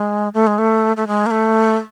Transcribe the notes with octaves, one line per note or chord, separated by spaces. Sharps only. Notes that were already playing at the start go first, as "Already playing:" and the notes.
Already playing: G#3
A3
G#3
A3
A3
G#3
A#3
A3